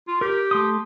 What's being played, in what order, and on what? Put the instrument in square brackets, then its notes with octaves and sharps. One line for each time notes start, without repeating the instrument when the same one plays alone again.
[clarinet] F4
[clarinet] G4 [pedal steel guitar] A#4
[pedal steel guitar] A3 C6 D#6